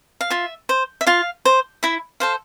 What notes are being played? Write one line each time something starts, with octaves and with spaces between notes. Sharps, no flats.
F5
F4 E5
C5
E5
F4 F5
C5
E4 E5
A4 C5 F5